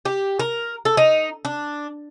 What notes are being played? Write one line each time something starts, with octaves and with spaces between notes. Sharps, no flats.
G4
A#4
A4
D#4
D4